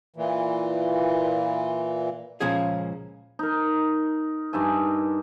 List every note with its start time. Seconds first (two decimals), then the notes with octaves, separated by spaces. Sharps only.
0.16 A#2 E3
2.40 C#2 A#2 F3 C#4 G#4
3.39 D#4 A#4
4.53 G2 D#4 E5 G#5